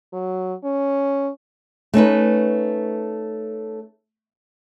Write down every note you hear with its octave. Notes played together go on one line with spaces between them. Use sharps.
F#3
C#4
A3 C#4 D#4 B4